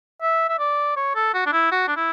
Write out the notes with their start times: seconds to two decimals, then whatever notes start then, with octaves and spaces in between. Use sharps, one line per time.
0.22 E5
0.49 E5
0.59 D5
0.96 C#5
1.15 A4
1.34 F#4
1.46 D4
1.52 E4
1.72 F#4
1.88 D4
1.97 E4